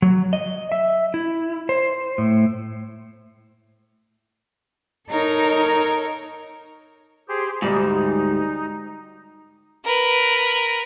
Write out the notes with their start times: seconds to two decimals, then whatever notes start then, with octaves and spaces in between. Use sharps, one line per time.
0.02 F#3
0.33 D#5
0.72 E5
1.14 E4
1.69 C5
2.18 A2
5.10 D#4 A4 A#4 C#5
7.28 G4 G#4 C5
7.62 D2 G#2 G3 D#4 G4
9.84 A#4 B4